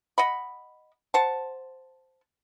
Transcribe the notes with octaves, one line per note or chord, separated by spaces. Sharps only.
D#5 F#5 B5
C5 F#5 A5